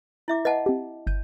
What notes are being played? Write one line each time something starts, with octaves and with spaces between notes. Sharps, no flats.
E4 E5 D6
B4 D#5 F#5 A5
C4 G4
G1 G6 D#7